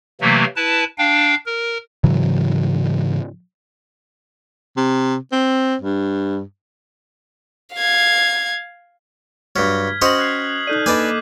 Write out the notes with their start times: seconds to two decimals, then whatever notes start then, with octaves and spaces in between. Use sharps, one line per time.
0.21 C3 E3 F#3 A3 A#3
0.56 E4 B4 A5
0.98 D4 F5 G5
1.46 A#4
2.04 G#2 C#3 E3 F#3
4.77 C3
5.32 C4
5.81 G2
7.75 F5 G#6
9.56 G2 F#3 F6 G#6 B6
10.02 C#4 F#4 C5 D#5 D#6 F#7
10.19 F#6 G#6 C7
10.67 D#4 A4 D5 F#6 G6 D#7
10.86 A#3 D4 A4 B4 D#5 G#5 D6